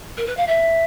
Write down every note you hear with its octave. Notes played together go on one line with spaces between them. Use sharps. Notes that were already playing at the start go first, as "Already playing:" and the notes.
A#4
B4
F5
E5